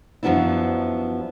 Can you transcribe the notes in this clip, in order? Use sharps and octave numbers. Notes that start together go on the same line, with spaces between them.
F#2 F3 F#3 B3 D4 E4